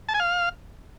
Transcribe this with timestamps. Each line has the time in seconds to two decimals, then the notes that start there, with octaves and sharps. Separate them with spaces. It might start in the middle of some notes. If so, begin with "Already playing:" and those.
0.09 A5
0.14 G#5
0.20 F5